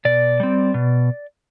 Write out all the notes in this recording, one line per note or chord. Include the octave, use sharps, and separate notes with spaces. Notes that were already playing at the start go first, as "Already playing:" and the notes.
B2 D5
G3 C4
B2